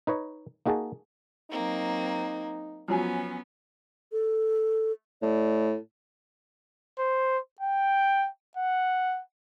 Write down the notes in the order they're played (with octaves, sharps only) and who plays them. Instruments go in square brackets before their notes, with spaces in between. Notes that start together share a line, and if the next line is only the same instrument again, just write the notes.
[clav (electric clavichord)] D#4 B4 C#5 D#5
A#3 D#4 F#4 G#4 D#5 A5
[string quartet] F#3 A#3 C4 [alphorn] D#4
[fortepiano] F3 F#3 G#5 [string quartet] B3 C#4
[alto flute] A4
[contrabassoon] A2 [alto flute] D5
[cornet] C5
G5
F#5